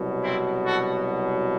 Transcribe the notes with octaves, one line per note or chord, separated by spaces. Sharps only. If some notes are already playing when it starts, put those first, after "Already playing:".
Already playing: C2 B2 F#3
C4 E4
F#4 A4